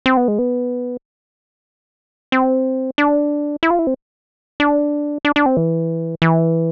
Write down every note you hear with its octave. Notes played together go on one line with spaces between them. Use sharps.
C4
B3
G#3
B3
C4
D4
E4
F4
E4
C4
D4
D4
D4
C4
E3
E3